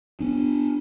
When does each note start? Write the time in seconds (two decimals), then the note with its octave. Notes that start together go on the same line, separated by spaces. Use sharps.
0.20 B3 D4